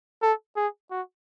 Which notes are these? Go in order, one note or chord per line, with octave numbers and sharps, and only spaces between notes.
A4
G#4
F#4